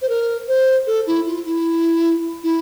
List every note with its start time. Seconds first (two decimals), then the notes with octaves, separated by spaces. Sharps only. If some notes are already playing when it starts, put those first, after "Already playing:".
0.02 C5
0.09 A#4
0.48 C5
0.86 A4
1.06 E4
1.26 F4
1.45 E4
2.43 E4